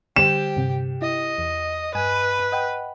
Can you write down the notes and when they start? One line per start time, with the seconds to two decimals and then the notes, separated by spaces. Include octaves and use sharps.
0.16 D3 G3 G4 C5 E7
0.56 G2 C3
1.02 E4 D#5
1.38 E2
1.95 G2 B4 G#5 D#7
2.52 D#5 F#5 G5